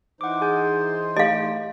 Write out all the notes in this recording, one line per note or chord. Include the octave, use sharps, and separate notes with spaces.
E3 D#4 C5 F#5 D6
G#4 G#5 G6
A3 D#5 F5 D7